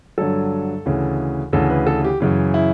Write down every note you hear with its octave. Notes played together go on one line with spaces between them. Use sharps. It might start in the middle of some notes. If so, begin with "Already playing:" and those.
G2 D3 F#3 A4
D2 C#3 E3
D2 C#3 E3 A4
B4
A4
G4
F#2 C#3 E3
E4